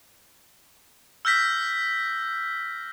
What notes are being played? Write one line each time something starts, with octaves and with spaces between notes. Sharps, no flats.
E6 F6 G6 A#6 B6